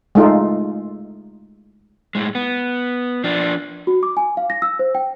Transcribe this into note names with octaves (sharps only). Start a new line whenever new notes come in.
G#3 A3 D#4 F4
A2 G#3
B3
F3 D4
F#4
D6
G#5
F5
A#6
E6
C5
G5